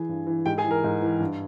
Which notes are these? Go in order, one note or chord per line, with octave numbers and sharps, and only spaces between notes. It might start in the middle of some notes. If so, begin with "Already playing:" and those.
Already playing: E3 G#4 G#5
G2
E3
G#2 G4 G5
G#4 G#5
E3
A#4
G#2
E3
G2